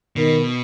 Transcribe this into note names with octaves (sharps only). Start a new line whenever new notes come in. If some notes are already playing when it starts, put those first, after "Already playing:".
B2 D#3